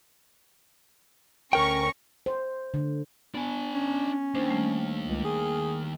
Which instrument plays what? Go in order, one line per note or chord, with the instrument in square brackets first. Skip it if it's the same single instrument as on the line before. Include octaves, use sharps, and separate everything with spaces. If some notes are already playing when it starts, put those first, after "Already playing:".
[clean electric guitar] D2 A#4 G5 [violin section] C#4 A#5 C#6
[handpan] C5
D3
[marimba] B3 [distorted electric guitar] D4 G#5
[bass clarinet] C#4
[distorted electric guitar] D#2 [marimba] D4 C5
[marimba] G3 A3
[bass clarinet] C#2
G#4